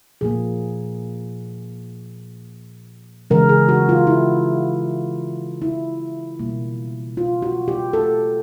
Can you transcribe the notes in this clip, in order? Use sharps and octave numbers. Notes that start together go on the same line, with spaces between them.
A#2 F3 A#3 G#4
C#3 E3 G#3 A#4
G#4
F#4
F4
E4
E4
B2 G3 A#3
F4
F#4
G4
A4